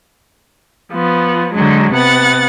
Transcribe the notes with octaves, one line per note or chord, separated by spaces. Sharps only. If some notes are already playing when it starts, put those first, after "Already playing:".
F3 B3
D3 F#3 G#3
C3 B3 F#5 A6